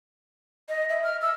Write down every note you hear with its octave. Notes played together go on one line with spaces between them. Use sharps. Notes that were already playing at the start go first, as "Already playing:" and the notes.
D#5
E5
F6
E6